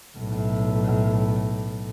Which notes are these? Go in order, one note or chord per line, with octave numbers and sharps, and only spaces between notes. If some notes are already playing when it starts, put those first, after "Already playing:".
B1 A2